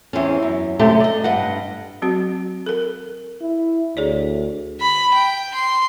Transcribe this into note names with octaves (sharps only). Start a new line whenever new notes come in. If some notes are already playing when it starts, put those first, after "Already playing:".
E2 C4 C#4
F#2
F#2 C3 A3 G4
D5 D#5
G2 D#5 F#5
F#3 C4 F#4
A4 A#4
E4
D2 G#4 C#5 D5
B5
G5
C6